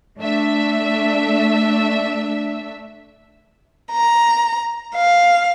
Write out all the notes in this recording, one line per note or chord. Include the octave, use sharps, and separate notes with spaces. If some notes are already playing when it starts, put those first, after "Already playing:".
A3 D4 E5
A#5
F5